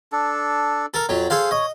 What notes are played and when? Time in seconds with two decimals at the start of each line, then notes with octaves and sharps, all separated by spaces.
0.12 D4 A4
0.94 A4 A#4
1.09 F2 F#3
1.30 G#4 A4 C5 F5
1.51 C#5 D#5